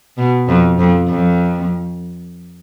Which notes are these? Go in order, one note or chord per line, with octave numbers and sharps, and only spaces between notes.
B2
F2
F2
F2